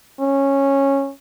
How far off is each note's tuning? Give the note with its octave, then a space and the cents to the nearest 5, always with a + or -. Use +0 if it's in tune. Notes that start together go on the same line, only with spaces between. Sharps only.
C#4 -10